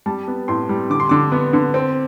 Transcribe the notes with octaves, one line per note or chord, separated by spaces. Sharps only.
G3 A5
B3
A2 C6
G3
D3 D6
C6
D3 D6
B3
D3
C4